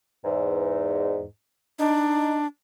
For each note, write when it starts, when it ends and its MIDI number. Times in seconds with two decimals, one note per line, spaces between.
0.24 1.24 40
0.24 1.24 44
1.79 2.46 62
1.79 2.35 63